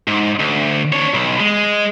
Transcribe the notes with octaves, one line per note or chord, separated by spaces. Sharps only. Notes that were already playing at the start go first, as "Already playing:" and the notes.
G#2
D2
D4 C#5
B1
G#3